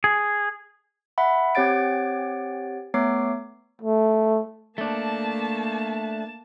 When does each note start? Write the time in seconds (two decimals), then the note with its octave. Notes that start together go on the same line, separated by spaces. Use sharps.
0.04 G#4
1.18 E5 F#5 B5
1.55 C4 G4 C#5 F#5 A6 D7
2.94 A3 B3 C#5 D6 C7
3.82 A3
4.78 A3 A#3 D4 A5